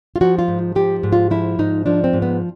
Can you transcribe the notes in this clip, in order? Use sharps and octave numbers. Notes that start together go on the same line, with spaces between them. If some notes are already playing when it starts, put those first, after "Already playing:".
F4
F3 F#4
F4
G#2
F3 G4
G#2
F4
F3 E4
G#2 D#4
F3 D4
C4
G#2
B3